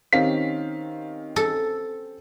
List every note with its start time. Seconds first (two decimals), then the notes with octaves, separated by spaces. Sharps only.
0.13 D#3 C4 C#4 G4 F5 B6
1.36 A4